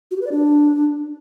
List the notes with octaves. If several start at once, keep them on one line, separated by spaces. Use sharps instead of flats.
F#4
G4
B4
D5
D4